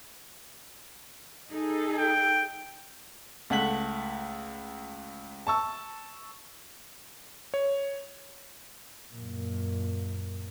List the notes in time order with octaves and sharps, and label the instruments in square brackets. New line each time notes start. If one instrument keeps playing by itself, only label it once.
[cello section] D#4 G#4 A4
[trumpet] G5
[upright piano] C#2 A3 F#5 B6 F#7
A5 C#6 E6
[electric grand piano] C#5
[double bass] F#2 A#2